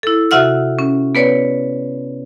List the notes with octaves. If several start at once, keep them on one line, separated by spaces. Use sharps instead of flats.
E4 A4
C3 F#4 E5 F#5 F6
C#4
B3 B4 C#5 D5